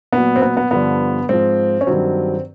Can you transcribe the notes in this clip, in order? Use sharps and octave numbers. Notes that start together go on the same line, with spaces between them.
A#2 F#3 B3
C4
B3
B3
G2 D3 F3 B3
G#2 F3 C4
C#4
G2 D#3 F#3 C4